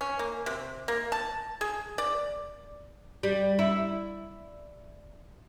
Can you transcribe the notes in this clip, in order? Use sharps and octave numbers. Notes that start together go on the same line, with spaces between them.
C#4
A#3
C3
A#3
A5
G#4
D5
G3
E4